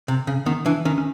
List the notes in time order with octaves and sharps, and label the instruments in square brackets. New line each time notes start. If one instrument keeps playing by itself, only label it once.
[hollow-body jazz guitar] C3
C#3
[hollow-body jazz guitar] D#3 [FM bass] B3
[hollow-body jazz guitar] E3 [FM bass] D4
[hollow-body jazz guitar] D#3 [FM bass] C#4
[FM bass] C#4